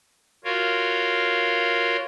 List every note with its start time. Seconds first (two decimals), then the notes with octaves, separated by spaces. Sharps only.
0.44 F4 F#4 A#4 C#5 F5